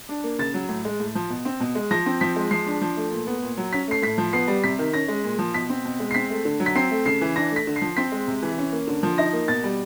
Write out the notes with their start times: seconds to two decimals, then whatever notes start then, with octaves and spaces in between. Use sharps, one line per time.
0.09 D4
0.24 A#3
0.39 C#3 A6
0.54 F#3
0.69 A2
0.85 G#3
1.00 A2
1.15 F3
1.30 B2
1.45 C4
1.60 B2
1.75 G#3
1.91 F3 A#6
2.06 C4
2.21 F3 B6
2.36 G#3
2.51 F3 C7
2.66 D4
2.81 F3
2.97 A3
3.12 A#2
3.27 B3
3.43 A#2
3.57 F#3
3.73 C#4 B6
3.88 A3 C7
4.02 A2 B6
4.18 F3
4.33 B3 C7
4.48 G3
4.64 C3 B6
4.79 D#3
4.94 C#4 A#6
5.08 G#3
5.24 A#2
5.39 F3
5.54 B2 B6
5.69 C4
5.85 B2
6.00 G#3
6.11 C7
6.14 C4 B6
6.30 A3
6.45 D3
6.60 F#3
6.66 B6
6.75 C4 C7
6.91 A3
7.06 C#3 C7
7.21 E3
7.36 D4 A#6
7.51 A3
7.56 B6
7.67 D3
7.76 C7
7.82 F3
7.97 C4 B6
8.12 G#3
8.27 C3
8.42 E3
8.58 C#4
8.72 A#3
8.88 D3
9.03 F3
9.18 D#4 A#6
9.33 A#3
9.48 B2 A6
9.64 G3